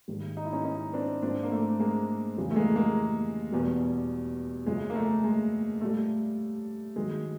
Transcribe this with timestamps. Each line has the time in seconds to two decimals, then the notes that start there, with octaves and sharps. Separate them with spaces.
0.08 G#2 D#3 G3
0.37 D#4
0.45 E4
0.53 C#4 D#4
0.65 C#4 D#4
0.93 C4 D4
1.22 G#2 F3 C4 D4
1.43 A#3
1.51 A3
1.80 G#3 A#3
2.37 F2 C#3 E3 G3
2.51 A3
2.56 G#3 A#3
2.76 G#3 A#3
3.52 E2 B2 G3
4.66 F#2 C#3 F3 G#3
4.90 A#3
4.95 A3
5.24 G#3
5.81 A#2 G3 A3
6.96 G2 D#3 F#3 G#3